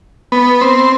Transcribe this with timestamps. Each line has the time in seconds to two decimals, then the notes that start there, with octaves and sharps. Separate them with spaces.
0.32 B3
0.61 C4